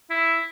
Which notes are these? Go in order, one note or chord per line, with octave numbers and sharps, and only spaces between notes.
E4